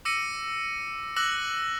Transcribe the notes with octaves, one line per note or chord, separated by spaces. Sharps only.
D6 E6 A#6 C#7 D#7
D6 E6 F#6 A#6 F#7